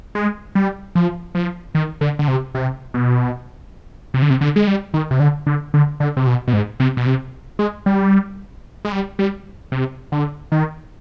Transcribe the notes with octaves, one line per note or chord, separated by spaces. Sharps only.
G#3
G3
F3
F3
D#3
D3
D3
C3
C3
B2
C3
D3
C3
D3
G#3
G3
D#3
C3
D3
D3
D3
D3
C3
B2
B2
G#2
C3
B2
C3
G#3
G3
G#3
G3
G3
C3
D3
D#3